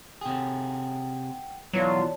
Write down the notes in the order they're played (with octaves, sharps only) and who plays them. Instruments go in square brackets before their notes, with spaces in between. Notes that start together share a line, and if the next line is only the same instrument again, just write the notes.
[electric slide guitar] C3 G#4 [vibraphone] F#5 G5
[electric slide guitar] B2 E3 [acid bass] F#3 [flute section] F4 [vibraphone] C#5 D5 A5